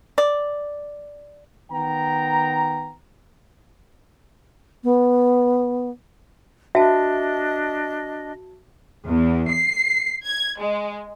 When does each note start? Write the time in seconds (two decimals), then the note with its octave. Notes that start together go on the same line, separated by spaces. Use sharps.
0.18 D5
1.71 D#3 B3 G5 A#5
4.83 B3
6.75 D4 F#4 D#5 E5 A5
9.06 E2
9.51 C7
10.25 G#6
10.60 G#3